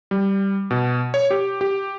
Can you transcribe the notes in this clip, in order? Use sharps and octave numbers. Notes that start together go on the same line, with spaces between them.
G3
B2
C#5
G4
G4